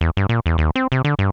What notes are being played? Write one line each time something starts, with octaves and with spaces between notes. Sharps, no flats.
E2
G2
A#2
E2
D#2
C4
C3
D3
G2